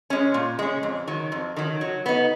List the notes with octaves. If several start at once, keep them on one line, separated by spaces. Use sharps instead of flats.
G#3 C#4
A#2
G#3 C#4
F2
D#3 F#3
F2
D#3 F#3
F#3
B3 D#4